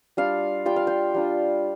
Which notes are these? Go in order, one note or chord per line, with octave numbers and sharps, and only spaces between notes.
G3 D4 F4 F5
G3 D4 F4 G5
F5
G5
G3 D4 F4